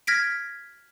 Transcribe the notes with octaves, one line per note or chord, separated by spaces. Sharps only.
F6 G#6 A#6 B6 D7